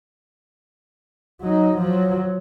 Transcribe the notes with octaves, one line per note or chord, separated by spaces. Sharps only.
F#3 D#4
F3 F#3